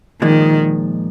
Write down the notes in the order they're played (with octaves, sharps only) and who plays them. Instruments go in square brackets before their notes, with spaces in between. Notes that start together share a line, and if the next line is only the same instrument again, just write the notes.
[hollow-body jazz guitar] A#2 F3 G#3 [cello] D#3